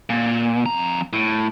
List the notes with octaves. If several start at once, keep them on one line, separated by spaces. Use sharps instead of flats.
A#2
F2 A#5
A2